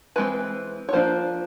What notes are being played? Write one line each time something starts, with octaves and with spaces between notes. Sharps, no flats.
E3 G#3 C4 B4
C#5
F3 A#3 D4 C5